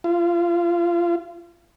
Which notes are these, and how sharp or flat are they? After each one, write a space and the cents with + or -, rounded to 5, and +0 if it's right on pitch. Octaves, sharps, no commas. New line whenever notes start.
F4 -25